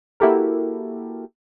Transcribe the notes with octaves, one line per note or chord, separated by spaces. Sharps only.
A#3 E4 F#4 G4 A4 A#4